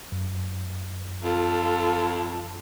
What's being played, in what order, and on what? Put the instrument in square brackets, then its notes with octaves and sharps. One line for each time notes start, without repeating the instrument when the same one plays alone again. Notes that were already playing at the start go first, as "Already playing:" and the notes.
[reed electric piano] F#2
[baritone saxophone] F2 [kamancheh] F4 A4